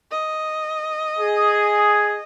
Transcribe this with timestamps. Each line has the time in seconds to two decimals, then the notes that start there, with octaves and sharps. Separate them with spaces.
0.11 D#5
1.20 G#4